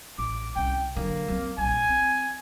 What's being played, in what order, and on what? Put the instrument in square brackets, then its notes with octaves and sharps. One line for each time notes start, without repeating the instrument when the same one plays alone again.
[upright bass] A1 [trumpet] D6
[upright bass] C2 C#4 [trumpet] G5
[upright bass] D3 F#3 [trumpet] A#3
[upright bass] F#3 C4
[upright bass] A#1 G3 [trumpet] G#5
[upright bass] C4